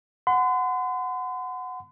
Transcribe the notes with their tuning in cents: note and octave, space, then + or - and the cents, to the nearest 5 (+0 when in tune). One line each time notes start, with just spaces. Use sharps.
F#5 -5 C6 -45